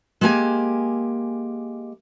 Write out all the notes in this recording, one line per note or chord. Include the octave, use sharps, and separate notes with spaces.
G#3 A#3 G4 G5 G#5